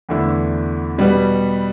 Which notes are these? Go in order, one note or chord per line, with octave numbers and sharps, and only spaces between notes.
E2 D3 A3 E4
B2 G3 B3